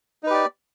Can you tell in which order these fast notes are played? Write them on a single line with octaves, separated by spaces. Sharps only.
D#4 B4 G4 D5